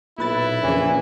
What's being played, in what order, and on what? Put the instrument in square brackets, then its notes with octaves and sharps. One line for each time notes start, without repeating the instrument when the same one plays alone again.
[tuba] B1 [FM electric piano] A#2 B4 A6 [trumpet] E4
[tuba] A#1 [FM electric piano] F2 C#3 [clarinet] E3